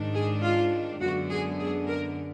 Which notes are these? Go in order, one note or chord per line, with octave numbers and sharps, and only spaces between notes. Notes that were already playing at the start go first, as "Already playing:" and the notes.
Already playing: G#2 D#3 G#3 D4
G#4
F4
F#2 D3 G#3 B3 F#4
G#4
G#4
A#4